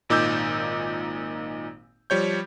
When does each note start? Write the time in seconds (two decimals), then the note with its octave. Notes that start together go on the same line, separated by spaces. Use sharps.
0.09 G#1 A#2 D#4 D6 E6 G6
2.10 F3 G3 C#5 G6